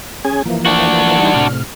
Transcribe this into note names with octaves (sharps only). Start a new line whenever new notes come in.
C#4 G#4 G#5
E3 F3 A#3
D4 F#4
E3 G3 D#4
A2 C3 F6